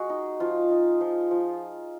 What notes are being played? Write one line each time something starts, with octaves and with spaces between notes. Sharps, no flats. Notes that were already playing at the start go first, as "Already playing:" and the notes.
Already playing: G#3 F#4 G#4
D#4
F3 F4
D#4
F3
F3